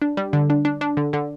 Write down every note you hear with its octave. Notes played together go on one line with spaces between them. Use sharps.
D4
G3
D3
D4
D4
D4
D3
D3